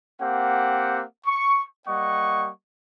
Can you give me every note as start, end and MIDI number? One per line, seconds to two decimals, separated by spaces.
0.21 1.03 58
0.21 1.03 60
0.21 1.03 67
0.21 1.03 78
1.26 1.63 85
1.87 2.50 55
1.87 2.50 58
1.87 2.50 75
1.87 2.50 78
1.87 2.50 85